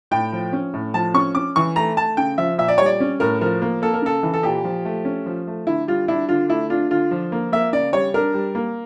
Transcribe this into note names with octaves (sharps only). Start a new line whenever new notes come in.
A2 G5
F3
C#4
A2
F3 A5
C#4 C#6
C#4 D6
E3 C#6
A3 A#5
A3 A5
C#3 G5
F3 E5
A#2 E5
D5
G3 C#5
D5
C#4
A2 A#4
F3 A#4
A#3
A#3 A4
A#4
C#3 A4
E3
A4
A#2 G4
F3
A3
C#4
F3
A3
D3 E4
G3 F4
D4 E4
D3 F4
A3 E4
D4 F4
D3 F4
F3
A#3
A#3 E5
C#3 D5
G3 C#5
D4 A#4
G3
A#3